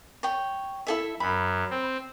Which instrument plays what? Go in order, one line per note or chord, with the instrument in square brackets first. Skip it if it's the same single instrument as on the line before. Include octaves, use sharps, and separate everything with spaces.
[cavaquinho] C#5 G5
E4 A4 E5
[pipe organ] F#2 [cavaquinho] B5
[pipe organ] C4